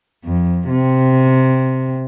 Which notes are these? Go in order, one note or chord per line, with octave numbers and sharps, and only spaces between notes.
F2
C3